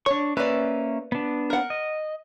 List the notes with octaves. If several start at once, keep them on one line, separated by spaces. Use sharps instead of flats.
D4 C#5 C#6
A#3 C#4 B4 D5 E5
B3 D4
A#4 F#5
D#5